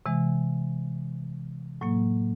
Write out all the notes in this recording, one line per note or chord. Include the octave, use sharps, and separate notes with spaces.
C3 E3 G#3
A2 F#3 A#3